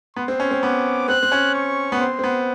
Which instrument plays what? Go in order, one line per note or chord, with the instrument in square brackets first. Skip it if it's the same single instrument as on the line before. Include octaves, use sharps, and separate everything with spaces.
[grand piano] B3 [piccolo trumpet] C6
[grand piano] C4
C#4
C4
[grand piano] B3 [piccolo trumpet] D6
[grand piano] C4 [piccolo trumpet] F#6
[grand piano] C4
C#4
[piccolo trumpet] C#6
[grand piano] B3
[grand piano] C4 [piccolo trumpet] C6
[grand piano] C4
B3